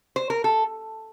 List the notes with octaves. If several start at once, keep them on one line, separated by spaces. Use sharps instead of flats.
C5
A#4
A4